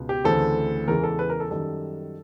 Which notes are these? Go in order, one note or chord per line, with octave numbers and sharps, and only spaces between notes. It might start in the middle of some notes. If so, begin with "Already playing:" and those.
Already playing: C#2 B2 B3
G4
D2 C#3 E3 A3 C4 A4
E2 C#3 E3 G#3 A#4
A4
B4
A#4
A4
F#2 D#3 G3 A4